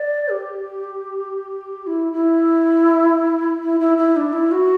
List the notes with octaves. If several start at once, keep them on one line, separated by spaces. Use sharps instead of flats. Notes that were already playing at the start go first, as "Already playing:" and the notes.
Already playing: D5
G4
E4
E4
E4
E4
E4
D4
E4
F#4